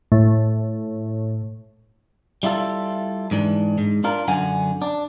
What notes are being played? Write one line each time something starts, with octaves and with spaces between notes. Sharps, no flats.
A2
G3 E4 F4 A4
G#2 E3 D4
G#2
D4 F4 A#4
F#2 D3 F#5 G#5
D4